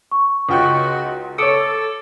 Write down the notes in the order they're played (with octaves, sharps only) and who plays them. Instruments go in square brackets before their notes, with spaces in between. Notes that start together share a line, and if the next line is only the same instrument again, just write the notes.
[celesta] C#6
[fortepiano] C#2 F4 G5 [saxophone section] D#4 F#4
[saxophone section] A4 [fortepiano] C#5 D#6 [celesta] D6 C#7 D7